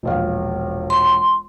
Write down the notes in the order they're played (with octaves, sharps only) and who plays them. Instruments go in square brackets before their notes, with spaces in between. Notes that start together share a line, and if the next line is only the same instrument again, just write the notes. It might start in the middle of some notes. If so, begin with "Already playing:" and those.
[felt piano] E1 A#1 F5
[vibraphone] C6